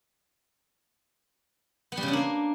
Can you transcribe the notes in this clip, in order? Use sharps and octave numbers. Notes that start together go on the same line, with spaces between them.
B3
G3
C#3
D4
A#3